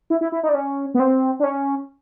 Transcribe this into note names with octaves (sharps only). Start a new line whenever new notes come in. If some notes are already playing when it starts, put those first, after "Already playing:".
E4
E4
E4
D#4
D4
C#4
B3
C4
D4
C#4